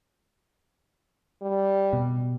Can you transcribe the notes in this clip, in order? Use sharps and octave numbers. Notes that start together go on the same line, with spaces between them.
G3
B2